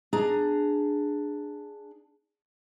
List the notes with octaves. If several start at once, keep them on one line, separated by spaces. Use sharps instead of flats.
D4 G#4 A#5